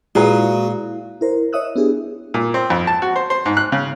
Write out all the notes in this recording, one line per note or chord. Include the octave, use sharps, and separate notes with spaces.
A#2 G#3 E4 F#4 G#4 B4 A#5
E4 A#4 C5
C#5 D#5 E5 D#6 E6 F#6
B3 D4 E4 G4 G#4
A#2
C4
F2
A5
F#4
C5
C5
G#2
F#6
C#3